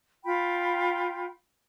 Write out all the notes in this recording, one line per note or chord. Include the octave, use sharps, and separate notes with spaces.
F4 G5 B5